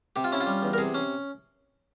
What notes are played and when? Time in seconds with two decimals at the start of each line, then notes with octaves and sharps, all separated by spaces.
0.16 C3 G4
0.24 F4
0.32 C#4 E4
0.41 F4
0.47 G3
0.63 E2
0.73 A#4
0.78 C3 G#4
0.94 C#4